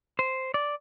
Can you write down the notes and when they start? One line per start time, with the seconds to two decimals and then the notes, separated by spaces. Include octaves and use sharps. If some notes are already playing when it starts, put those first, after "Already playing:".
0.19 C5
0.54 D5